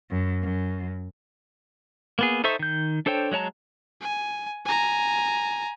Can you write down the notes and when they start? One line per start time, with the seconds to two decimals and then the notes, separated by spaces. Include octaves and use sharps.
0.10 F#2
0.43 F#2
2.19 A#3 B3 G#4
2.44 D#4 A4 C5 E5 C#6
2.59 D#3 G6
3.06 D4 A4 C5 C#5 G5
3.32 F#3 G#3 C#5 A5 A#5
4.01 G#5
4.65 G#5 A#5